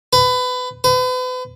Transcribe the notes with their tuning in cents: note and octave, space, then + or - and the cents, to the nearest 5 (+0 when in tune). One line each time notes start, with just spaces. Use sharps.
B4 +25
B4 +40